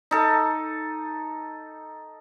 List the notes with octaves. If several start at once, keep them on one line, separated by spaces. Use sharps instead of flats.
D#4 A4